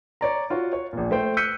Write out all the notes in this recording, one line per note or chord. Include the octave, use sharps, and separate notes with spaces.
C#5 D5 A#5
F4 F#4 C#5
C#5
A#1 A#2
A3 C5 G5
E6 F#6 G6 B6 C#7 D#7